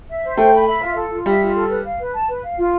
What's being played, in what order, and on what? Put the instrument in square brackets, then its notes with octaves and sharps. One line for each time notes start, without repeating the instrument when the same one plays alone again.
[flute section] E5
C5
[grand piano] A3 [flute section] G5
[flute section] B5
E5
F4
A4
F4
[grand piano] G3 [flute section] E5
[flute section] F4
A4
B4
F5
B4
A5
B4
F5
F4